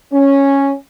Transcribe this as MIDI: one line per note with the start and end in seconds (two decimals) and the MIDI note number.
0.13 0.74 61